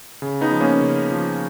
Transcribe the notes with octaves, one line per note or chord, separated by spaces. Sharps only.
C#3
B3 D#4
F3
A#3 C#4
C#3
F3